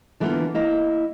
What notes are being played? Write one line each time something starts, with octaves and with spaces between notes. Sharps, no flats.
D3 E3 G3 A#3 B3 F4
A#3 E4 D#5 F5